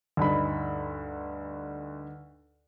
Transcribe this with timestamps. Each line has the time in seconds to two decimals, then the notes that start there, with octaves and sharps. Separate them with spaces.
0.17 D2 G2 D#4 B5